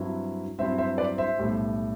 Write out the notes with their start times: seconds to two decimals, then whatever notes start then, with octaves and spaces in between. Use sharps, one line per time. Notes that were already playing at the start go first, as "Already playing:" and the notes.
Already playing: G2 F#3 C4 E4
0.59 G2 F#3 C4 E4 C5 E5
0.78 C5 E5
0.98 B4 D5
1.18 C5 E5
1.38 B1 A2 G3